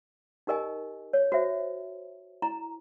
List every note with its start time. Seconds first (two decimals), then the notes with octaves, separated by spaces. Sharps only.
0.47 D#4 G4 A#4 D#5 G#5
1.13 C#5
1.32 F#4 C5 E5
2.42 E4 A#5